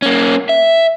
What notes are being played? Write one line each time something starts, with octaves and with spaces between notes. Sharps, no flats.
A#3 C#4
E5